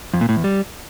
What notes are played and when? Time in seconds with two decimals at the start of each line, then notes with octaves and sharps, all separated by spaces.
0.14 F2
0.21 A#2
0.29 A2
0.36 E2
0.44 G3